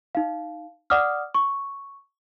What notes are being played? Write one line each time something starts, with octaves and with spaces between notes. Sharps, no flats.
D#4 F5
D5 F#5 D6 D#6 F6
C#6